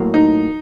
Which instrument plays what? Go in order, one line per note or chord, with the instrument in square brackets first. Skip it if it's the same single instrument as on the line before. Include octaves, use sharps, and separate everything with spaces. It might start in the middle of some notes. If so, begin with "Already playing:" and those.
Already playing: [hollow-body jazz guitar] A2 F#3 A#3
[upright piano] D#4